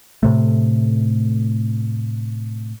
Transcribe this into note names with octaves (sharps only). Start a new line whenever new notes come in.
A2 C3 A3